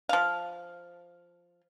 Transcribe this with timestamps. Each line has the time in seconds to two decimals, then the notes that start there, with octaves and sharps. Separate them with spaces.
0.09 F3 F5